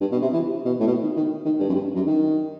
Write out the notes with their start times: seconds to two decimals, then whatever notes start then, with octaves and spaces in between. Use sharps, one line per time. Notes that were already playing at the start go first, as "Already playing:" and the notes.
0.01 G2
0.12 B2
0.22 C3
0.33 E3
0.65 B2
0.80 A2
0.87 B2
1.02 D#3
1.16 D#3
1.45 D#3
1.60 G2
1.69 F#2
1.74 G2
1.95 F#2
2.07 D#3